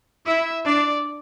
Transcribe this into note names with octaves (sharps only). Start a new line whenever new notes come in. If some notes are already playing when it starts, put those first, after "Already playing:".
E4 E5
D4 D5